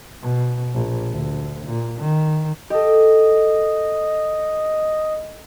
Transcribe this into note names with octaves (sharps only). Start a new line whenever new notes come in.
B2
A#1
D2
A#2
D#3
G4 A4 D#5